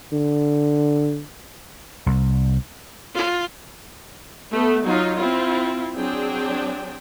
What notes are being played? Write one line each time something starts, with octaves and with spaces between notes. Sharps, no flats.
D3
C2
F4
A3 B3
F#3 D#4 F4
C4 E4 F4
F#3 C4 D4 G#4 G5